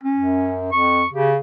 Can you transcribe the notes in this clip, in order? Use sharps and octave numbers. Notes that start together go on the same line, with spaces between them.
C#4
F#2
F2 C#6
C#3 G4